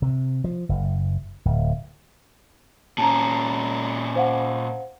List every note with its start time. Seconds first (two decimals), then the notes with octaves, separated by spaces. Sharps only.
0.02 C3
0.44 F3
0.69 F#1
1.45 D1
2.98 A#2 C#4 A5 A#5
4.15 C5 F5 F#5